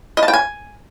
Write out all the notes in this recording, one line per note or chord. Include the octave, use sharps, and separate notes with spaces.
D#5
A5
G5
G#5